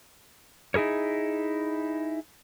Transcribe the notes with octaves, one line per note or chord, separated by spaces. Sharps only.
D#4 E4 G#4 A#4 C#5